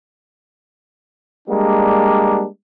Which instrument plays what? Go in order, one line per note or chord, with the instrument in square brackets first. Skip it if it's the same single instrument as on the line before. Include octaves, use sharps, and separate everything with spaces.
[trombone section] G3 G#3 A#3 D4